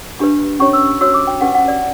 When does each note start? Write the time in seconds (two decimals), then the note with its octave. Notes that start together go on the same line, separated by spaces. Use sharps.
0.19 D4 G4 B4 B5
0.59 C#4 G4 C#5 C#6
0.73 E6
1.01 F#4 C#5 E6
1.14 D6
1.27 G5
1.41 C#4 G4 B4 F#5
1.55 F#5
1.68 D5